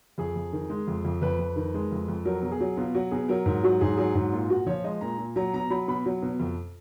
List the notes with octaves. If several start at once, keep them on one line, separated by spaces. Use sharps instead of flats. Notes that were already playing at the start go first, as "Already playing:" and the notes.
F2 G#4
F2
D#3
G#3
F2
F2
F2 B4
F2
D#3
G#3
F2
F2
F#3 A#4
B2
G#4
F#3
B2 F4
F#3 F#4
B2 G#4
F#3 A#4
G#2 A#4
F#3 F#4
G#2 G#4
F#3 G#4
G#2
A#2 F4
A#2 F#4
F3 C#5
G#3 D#5
A#2 A#5
A#2
F#3 A#5
B2 A#5
F#3 B5
B2 B5
F#3
B2
F2